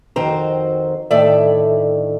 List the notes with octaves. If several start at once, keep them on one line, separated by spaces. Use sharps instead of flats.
F2 D#3 C4 F#4 C5 A#5
D2 A2 D#3 A4 D5 E5